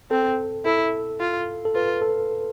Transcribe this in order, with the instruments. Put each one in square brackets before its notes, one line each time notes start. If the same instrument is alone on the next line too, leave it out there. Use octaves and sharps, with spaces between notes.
[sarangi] C4 [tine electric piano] A4
[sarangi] E4 [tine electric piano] A4
[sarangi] F4
[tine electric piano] A4
[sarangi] F4 [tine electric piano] B4
[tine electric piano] A4